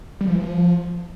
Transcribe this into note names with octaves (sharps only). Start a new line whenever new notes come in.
G3
F3
E3
F3